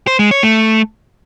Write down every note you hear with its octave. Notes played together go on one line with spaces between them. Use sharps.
C5
G#3
C#5
A3